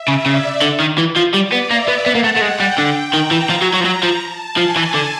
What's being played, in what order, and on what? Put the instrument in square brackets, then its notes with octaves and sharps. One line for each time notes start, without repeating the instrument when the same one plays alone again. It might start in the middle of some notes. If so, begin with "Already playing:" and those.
Already playing: [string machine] E5
[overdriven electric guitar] C#3
[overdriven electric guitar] C#3 [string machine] D5
[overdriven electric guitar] D3
D#3
E3
F3
[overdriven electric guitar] G3 [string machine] D5
[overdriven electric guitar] B3
[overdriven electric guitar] A#3 [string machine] E5
[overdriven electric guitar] B3
[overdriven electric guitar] B3 [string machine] F#5
[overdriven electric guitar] A#3
A3
A3
[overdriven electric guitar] G#3 [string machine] G5
[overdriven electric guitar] G3
[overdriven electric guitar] D3 [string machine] G5
[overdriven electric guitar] D#3 [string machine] A#5
[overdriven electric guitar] E3
F3
F#3
F#3
F3
F#3
F3
[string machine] A5
[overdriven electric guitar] F3 [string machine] G#5
[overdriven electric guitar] E3
D3